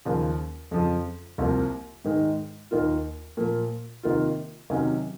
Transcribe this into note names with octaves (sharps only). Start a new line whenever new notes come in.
D#2 C#3 F3
F2 C#3 F3
C2 C3 F3 A#3
G#2 D#3 G#3
D#2 D#3 A#3 F4
A#2 F3 A#3
C3 D#3 A#3 F4
C3 D#3 F#3 C#4